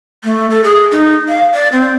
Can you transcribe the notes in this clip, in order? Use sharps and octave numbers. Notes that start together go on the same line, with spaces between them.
A3
A4
G#4
D#4
F5
D5
C4